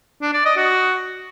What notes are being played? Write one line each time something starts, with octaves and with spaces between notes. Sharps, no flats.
D4
D5
D#5
F#4